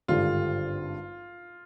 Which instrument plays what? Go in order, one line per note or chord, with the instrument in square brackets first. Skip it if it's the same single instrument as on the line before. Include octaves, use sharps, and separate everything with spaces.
[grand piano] G#1 G2 D3 G3 [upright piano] F4